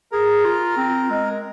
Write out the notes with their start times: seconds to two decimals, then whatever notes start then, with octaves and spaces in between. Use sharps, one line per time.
0.12 G#4 A#4
0.45 F4
0.77 C4
1.10 G#3